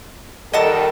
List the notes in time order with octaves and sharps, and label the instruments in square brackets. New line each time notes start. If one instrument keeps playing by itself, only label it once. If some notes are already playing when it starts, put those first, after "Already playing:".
[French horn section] D#3 G3 A4 [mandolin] D#5 F#5 A5